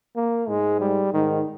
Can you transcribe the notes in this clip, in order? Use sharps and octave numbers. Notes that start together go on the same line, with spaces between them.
A#3
G#2 G#3
G3
G#2 D#3